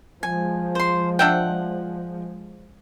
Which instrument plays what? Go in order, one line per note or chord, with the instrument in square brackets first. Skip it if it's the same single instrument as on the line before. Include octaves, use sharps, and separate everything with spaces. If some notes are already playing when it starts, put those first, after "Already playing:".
[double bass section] F3 G#3 [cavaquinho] G#5
[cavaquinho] C5 C6
[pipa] D4 E5 G5 [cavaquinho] F#5